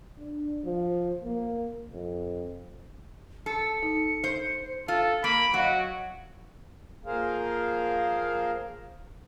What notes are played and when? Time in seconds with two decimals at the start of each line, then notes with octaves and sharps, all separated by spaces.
0.19 D4
0.64 F3
1.23 A#3
1.91 F2
3.46 A4 C#7
3.83 D#4
4.24 C5
4.88 F4 A4
5.24 A#3 B5 D7
5.54 F#3 F#4 D#5 F5 F#5
7.06 F3 A#3 G#4 A#4 C5 F5